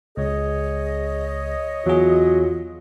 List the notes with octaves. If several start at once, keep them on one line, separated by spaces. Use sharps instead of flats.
C#2 G#4 C#5 D#5
E2 F#3 F4 G#4